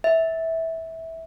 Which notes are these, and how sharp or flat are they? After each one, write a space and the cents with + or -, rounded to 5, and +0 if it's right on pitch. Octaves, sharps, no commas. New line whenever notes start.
E5 -15